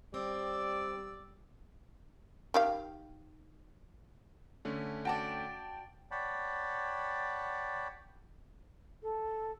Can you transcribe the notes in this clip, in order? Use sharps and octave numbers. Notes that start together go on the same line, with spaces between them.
G3 C4 D5 E6
D#3 G4 F5
D3 A3 C#4
F#4 D5 G5 A5
C#5 D5 F#5 G5 A5 B5
A4